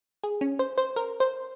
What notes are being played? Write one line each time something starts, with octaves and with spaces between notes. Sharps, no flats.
G#4
C#4
C5
C5
A#4
C5